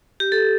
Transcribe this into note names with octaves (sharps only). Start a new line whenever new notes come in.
G4
A4